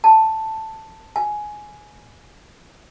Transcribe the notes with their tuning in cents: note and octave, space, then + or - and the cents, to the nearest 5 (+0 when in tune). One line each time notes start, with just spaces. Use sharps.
A5 +5
G#5 +10